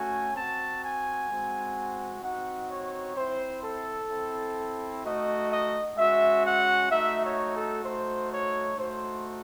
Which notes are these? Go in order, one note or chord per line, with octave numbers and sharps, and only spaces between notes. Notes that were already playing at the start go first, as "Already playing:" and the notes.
Already playing: A3 C#4 F#4 G#5
C4 A5
F#4
G#5
G#3 C4 F#4
C4 D#4 F#4 F#5
C#5
C4 E4 C5
A4
C4 E4
A3 D#4 F#4 D#5
D#5
G#3 C#4 F#4 E5
F#5
A3 D#4 F#4 E5
C#5
A4
A3 D#4 F#4 C5
C#5
A3 D#4 F#4 C5